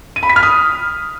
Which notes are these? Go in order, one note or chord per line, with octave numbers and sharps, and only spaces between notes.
D#7
B5
B6
F6
D#6